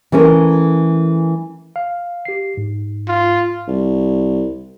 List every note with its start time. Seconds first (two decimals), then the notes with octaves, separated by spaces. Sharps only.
0.12 E3 A3 C#4 A#4
1.76 F5
2.25 G4 C7
2.57 G#2
3.08 F4
3.68 C2